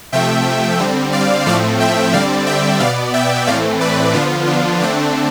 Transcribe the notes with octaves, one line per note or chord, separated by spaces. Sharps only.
C3 F3 A3 E5 G5
D3 G3 C4
D5 F5
A2 F3 A3 C4 D5 F5
E5 G5
D3 G3 C4 D5 F5
E5 G5
B2 B3 D5 F5
E5 G5
A2 E3 A3 C4 D5 F5
B4 D5
D3 F3 B3 D4 F4
D4
D3 A3 C4 D4